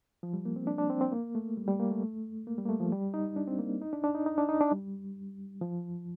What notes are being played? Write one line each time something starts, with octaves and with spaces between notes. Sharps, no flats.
F3
G3
A#3
C4
D4
D4
C4
C4
A#3
A3
G3
G3
A#3
A3
A#3
G3
A#3
A3
F3
G3
D#4
D4
C4
A#3
D#4
D4
D4
D#4
D#4
D4
D#4
D4
G3
F3